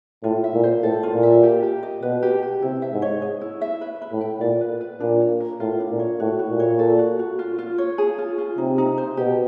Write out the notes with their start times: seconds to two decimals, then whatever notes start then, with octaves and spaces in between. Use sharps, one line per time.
0.23 A2 F4
0.44 E5
0.53 A#2
0.63 C5
0.83 A2 A4
1.03 F4
1.13 A#2
1.23 E5
1.43 G4
1.63 G4
1.83 D#5
2.02 B2 B4
2.23 G4
2.42 G4
2.62 C3 E4
2.82 E5
2.92 G#2
3.02 C#5
3.22 G#4
3.41 E4
3.61 E5
3.81 B4
4.02 B4
4.12 A2
4.21 G5
4.40 A#2 D5
4.61 B4
4.81 B4
5.00 A#2 D4
5.20 C#5
5.40 A#4
5.60 A2 F4
5.80 D4
5.89 A#2
6.00 C#5
6.20 A2 F#4
6.39 F#4
6.50 A#2
6.60 C#5
6.79 A4
6.99 F#4
7.19 F#4
7.39 F4
7.58 F4
7.78 C#5
7.98 G#4
8.18 F4
8.38 F4
8.58 C3 D#4
8.78 D#4
8.98 C5
9.17 B2 G4